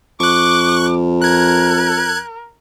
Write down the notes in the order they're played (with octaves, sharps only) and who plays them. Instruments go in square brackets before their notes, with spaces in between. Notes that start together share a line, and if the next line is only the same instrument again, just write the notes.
[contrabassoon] F2 [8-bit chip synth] C#6 F#6 [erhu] D6
[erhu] A#4 [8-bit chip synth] F#6 G#6